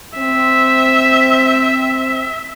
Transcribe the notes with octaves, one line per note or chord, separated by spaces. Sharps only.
C4 E5